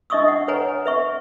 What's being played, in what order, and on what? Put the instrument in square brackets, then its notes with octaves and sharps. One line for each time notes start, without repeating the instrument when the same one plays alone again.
[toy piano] D4 D#5 E5 C#6 D#6 E6
F#5
B4 C#5 F#5 G#5 A#5
B4 E5 C#6